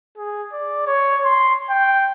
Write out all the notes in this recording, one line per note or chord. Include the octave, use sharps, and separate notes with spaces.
G#4
D5
C#5
C6
G5